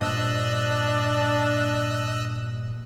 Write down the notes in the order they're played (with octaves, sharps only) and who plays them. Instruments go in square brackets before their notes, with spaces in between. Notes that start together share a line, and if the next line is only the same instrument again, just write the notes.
[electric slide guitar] G2 A#2 C5 [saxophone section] D4 [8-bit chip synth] D#5 E6 F#6